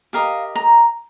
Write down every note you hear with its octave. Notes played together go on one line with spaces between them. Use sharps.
G4 A#4 D#5 F5
A#5